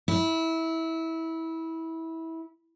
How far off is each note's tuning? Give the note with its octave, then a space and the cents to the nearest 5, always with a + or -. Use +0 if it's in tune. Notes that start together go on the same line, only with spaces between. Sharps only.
E4 -20